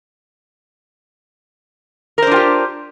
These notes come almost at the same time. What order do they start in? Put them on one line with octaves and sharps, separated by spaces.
A#4 C5 D4 F4 G4